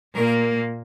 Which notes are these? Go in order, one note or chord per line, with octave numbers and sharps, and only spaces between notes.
A#2 A#3 A#4